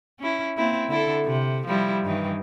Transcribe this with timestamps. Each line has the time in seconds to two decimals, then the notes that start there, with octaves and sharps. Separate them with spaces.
0.19 C#4 E4
0.57 A#3 C4 E4
0.88 D3 E4 A4
1.25 C3
1.67 F3 G3 E4
2.05 G2 D#3 E3